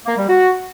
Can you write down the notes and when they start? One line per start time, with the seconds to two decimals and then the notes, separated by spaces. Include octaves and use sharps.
0.06 A#3
0.16 G3
0.27 F#4